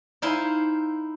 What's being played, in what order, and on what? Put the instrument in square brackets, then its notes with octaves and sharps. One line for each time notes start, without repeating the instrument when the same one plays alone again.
[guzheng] D#4 E4 C5 F5 G#5 C6